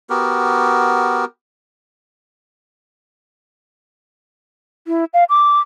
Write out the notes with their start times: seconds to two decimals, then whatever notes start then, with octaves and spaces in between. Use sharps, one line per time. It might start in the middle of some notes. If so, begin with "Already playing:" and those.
0.10 B3 F#4 G4 A#4
4.87 E4
5.14 F5
5.29 D6